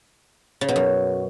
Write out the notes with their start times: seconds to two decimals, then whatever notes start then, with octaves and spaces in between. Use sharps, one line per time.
0.61 C#3
0.69 B2
0.76 F#2